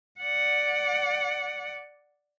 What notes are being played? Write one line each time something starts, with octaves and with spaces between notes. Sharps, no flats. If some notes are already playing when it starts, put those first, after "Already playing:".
D5 F#5